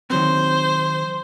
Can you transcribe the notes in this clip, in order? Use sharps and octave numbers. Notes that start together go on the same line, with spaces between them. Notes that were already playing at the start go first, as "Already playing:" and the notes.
D#3 F#3 C4 C5